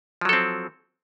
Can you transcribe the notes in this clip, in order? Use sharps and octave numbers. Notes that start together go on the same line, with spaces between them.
F3 F#3 C4 A4